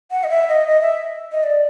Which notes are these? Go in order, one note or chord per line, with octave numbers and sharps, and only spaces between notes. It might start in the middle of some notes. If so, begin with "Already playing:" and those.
F#5
D#5
E5
D#5
D#5
E5
D#5
D5